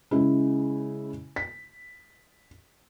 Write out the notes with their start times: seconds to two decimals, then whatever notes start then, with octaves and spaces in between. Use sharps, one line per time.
0.11 C#3 G#3 E4
1.36 B6